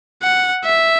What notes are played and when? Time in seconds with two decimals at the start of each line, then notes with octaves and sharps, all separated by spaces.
0.23 F#5
0.64 E5